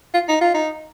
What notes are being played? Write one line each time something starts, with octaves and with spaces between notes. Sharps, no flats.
F4
D#4
F4
D#4